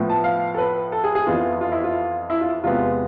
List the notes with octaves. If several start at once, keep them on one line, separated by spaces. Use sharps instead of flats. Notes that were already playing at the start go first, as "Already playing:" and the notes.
Already playing: A2 F3 B3
A5
F5
A4
B4
A4
G#4
G#4
F2 E3 B3 F4
F4
E4
F4
E4
F4
E2 C3 G#3 B3 F4